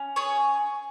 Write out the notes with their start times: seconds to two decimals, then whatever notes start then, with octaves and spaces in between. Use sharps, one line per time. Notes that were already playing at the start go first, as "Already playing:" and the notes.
Already playing: C#4
0.16 G#4 C#5